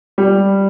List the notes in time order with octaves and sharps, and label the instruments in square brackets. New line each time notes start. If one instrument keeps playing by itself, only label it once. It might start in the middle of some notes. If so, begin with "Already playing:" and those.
[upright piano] G3